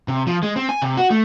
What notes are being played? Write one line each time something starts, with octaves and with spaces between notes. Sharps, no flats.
C3
F3
G#3
C4
G#5
C3
F#4
A3